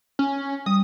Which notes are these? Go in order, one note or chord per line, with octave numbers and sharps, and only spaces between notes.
C#4
G3 D#6